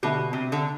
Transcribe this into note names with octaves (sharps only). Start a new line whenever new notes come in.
B2 D3 A3 D4 G4
C3
D3